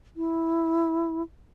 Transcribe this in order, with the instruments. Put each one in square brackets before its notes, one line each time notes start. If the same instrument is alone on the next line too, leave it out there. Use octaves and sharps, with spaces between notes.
[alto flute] E4